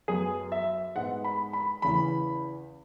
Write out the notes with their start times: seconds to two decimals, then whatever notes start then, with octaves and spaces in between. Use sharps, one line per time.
0.08 F#2 F#3 B3 G#4
0.52 E5
0.96 G#2 G#3 B3 F#5
1.24 B5
1.53 B5
1.82 E2 C#3 E3 B5